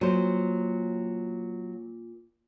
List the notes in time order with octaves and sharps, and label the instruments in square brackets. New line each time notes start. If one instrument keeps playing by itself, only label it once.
[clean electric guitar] A#2 [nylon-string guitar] F#3 C5